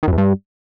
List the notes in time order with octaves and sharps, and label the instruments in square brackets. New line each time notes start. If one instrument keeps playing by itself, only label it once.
[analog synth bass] D#3
F#2
E2
G2